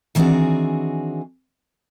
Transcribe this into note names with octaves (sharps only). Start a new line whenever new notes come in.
D#3 E3 C4 D4 F#4 G#4